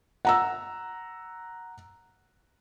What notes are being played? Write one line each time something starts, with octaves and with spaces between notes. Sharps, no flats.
F#5 A#5 E6